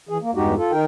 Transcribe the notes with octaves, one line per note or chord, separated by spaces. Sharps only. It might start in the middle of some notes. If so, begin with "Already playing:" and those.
E3 G#4
A#3
E2 G2 G#3 D#4 F#4 G4
F4 A4
D#3 D#4 A#4 G5